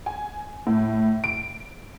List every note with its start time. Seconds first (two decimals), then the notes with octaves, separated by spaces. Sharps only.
0.06 G#5
0.67 A2
1.24 D7